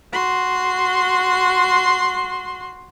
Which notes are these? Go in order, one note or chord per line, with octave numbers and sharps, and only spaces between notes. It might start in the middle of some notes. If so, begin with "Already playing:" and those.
F#4 C6